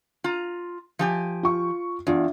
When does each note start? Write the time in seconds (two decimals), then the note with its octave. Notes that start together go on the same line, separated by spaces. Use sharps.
0.24 F4 A#5
0.99 F3 G4 G#5
1.43 F4 C#6
2.07 E2 D4 F4